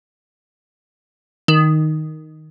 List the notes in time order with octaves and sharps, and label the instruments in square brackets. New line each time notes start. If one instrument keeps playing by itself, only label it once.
[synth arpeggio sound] D#3